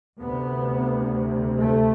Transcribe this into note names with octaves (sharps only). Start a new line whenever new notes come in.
D2 C3 B3
A3